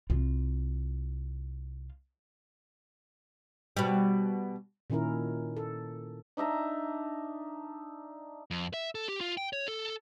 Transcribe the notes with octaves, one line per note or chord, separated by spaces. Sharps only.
C2 F4
B2 G3
A#2 D#3 C#4 E4 A#4
A4
D4 D#4 E5 A#5
F2
E5
A4
G4
F4
G5
C#5
A4